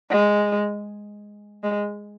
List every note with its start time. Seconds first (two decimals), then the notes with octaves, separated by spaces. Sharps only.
0.10 G#3
1.63 G#3